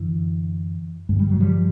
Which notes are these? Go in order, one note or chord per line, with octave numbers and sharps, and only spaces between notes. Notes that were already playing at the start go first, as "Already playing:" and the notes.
Already playing: F#2 D3 E3
G2 D3 G#3
G3
F#3
F3 G3